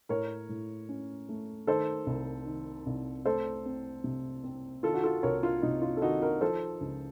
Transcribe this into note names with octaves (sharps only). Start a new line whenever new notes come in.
A2 A#4 C#5
A2
C#4
A3
D#3 A4 C5
C2
D#3
C2
A3 A4 C5
C4
C3
C4
D#3 F4 A4
F#4
F4 A4
C2 A#4 C#5
F4
C3 D#4
F4
A4
D#3 D#4 F#4
F#4 A#4
F3 A4 C5
C#2